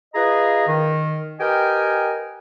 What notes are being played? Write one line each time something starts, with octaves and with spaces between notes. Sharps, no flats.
F4 G#4 B4 D#5 A#5
D#3
G4 A#4 B4 D#5 G5 G#5